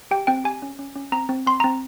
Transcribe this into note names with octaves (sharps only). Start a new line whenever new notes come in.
G4 G5
C4 G5
G4 G#5
C#4
C#4
C#4
C4 A#5
C4
C4 C6
C4 A#5